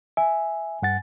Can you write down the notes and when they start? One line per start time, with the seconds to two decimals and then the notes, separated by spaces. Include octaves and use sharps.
0.17 E5 G#5
0.82 G2 F#5 A6